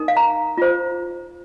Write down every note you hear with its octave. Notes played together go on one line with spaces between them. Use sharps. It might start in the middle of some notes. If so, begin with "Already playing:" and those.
Already playing: D#4 A#4
F5
A#5
F4 C5